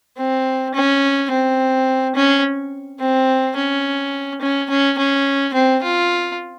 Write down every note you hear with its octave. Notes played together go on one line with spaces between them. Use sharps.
C4
C#4
C4
C#4
C4
C#4
C#4
C#4
C#4
C4
F4